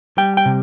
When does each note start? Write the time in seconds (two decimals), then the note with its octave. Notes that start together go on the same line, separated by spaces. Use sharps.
0.18 G3 G5
0.37 G5
0.46 C3